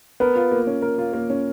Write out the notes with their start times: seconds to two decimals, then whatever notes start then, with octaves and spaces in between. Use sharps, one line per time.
0.20 B3 A#4
0.36 F4
0.51 A#3
0.67 C#4
0.82 A#4
0.98 F4
1.13 A#3
1.30 C#4